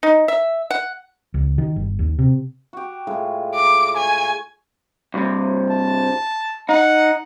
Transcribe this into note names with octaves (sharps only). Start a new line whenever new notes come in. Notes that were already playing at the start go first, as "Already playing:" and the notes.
D#4
E5
F#5
C#2
D#3
G1
D#2
C3
F#4 G4
A2 G#3 F4
D6
C#5 G#5
C2 G2 C3
A5
D#4 F#5